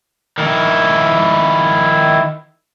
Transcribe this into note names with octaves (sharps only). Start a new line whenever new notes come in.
D#3 E4